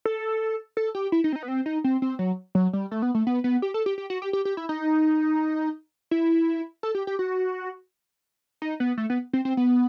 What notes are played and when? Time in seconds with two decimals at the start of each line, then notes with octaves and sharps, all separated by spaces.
0.05 A4
0.77 A4
0.95 G4
1.12 E4
1.24 D#4
1.33 C4
1.36 D#4
1.43 B3
1.48 C4
1.66 D#4
1.84 C4
2.02 C4
2.19 F#3
2.55 F#3
2.73 G3
2.91 A3
3.02 B3
3.15 A3
3.27 B3
3.44 B3
3.62 G4
3.74 A4
3.86 G4
3.98 G4
4.10 F#4
4.22 G4
4.33 G4
4.45 G4
4.57 E4
4.69 D#4
6.11 E4
6.83 A4
6.95 G4
7.07 G4
7.19 F#4
8.62 D#4
8.80 B3
8.97 A3
9.10 B3
9.33 C4
9.45 C4
9.57 B3